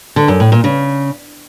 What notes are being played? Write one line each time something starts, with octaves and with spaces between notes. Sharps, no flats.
D3
F#2
A2
A#2
C#3